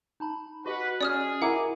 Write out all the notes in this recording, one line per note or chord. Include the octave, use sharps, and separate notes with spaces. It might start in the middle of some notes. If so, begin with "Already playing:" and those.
D#4 A5 B5
F#4 G4 B4 D#5 F#5
C#4 G#4 D5 D#6 F6
E4 A#4 F#5 A#5 D6